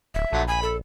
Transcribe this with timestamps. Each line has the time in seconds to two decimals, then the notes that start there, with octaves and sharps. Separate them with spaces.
0.14 D1 E5
0.33 A#1 D3 F#3 A3
0.48 G#5 B5
0.63 A4